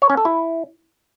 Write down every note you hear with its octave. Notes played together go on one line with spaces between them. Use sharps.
C#5
C#4
A4
E4